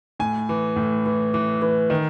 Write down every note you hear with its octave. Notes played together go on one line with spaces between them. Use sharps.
A2 G#5
E3
A2
E3
E3
E3
D#3